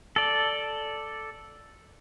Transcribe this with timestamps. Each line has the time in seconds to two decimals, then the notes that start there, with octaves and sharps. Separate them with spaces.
0.16 A4 D5